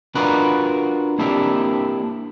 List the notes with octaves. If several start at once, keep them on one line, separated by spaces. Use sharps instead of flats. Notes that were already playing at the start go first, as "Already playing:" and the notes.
D4 F4 F#4 A#4 B4
A#3 C4 D4 E4 G4 A#4